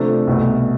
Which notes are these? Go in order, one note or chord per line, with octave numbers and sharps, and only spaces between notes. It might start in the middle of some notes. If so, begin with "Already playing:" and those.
Already playing: C3 F3 A3 D4 A4
C2 B2 A3